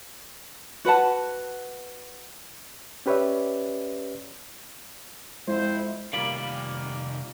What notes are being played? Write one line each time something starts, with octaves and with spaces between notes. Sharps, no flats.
F#4 B4 F#5 A5
C#4 G4 B4 C#5 D5 E5
F2 G#3 E4 C5
C3 D#3 G3 A#3 F4 D5 F5 B5